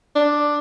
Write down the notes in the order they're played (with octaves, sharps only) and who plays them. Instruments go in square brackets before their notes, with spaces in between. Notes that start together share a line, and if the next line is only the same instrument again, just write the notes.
[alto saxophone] D4